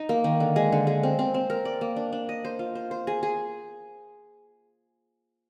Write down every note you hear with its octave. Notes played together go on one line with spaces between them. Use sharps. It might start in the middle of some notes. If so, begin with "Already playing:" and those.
Already playing: D#4
A#3
D#3
D3
G#3
D3
G#3
C4
C4
C4
A#4
D5
A#3
D4
D4
D#5
C5
F4
C5
C5
G#4
G#4